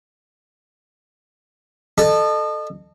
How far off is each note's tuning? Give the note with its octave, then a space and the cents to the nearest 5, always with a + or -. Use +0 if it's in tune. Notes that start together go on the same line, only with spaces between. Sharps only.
A4 +0 D#5 -35